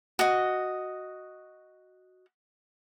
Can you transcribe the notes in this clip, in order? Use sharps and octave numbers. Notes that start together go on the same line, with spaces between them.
F#4 D#5